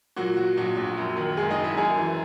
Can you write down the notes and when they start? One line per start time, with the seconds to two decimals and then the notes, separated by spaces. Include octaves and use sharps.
0.16 A#2 F#3 F#4
0.37 F#3 F#4
0.57 A#1 F#3 F#4
0.77 A#1
0.97 F#2
1.17 D#3
1.37 F#1 G#3 G#4
1.51 D#4 D#5
1.58 F#1
1.64 E4 E5
1.77 F#2 G#4 G#5
1.97 E3